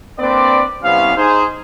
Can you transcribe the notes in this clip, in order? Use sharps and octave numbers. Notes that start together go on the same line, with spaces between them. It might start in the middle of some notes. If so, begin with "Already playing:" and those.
A#3 C4 D4 B4 D5
C2 B3 C#4 F5
D#4 G#4 C5